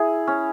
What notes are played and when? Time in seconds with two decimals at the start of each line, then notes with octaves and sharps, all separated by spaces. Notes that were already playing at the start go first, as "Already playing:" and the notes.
Already playing: E4 G#4
0.27 C#4